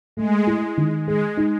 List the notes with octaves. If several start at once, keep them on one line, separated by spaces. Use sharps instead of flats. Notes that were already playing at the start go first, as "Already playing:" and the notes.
G#3 A3
E4
D#3
G#3 G#4
D#4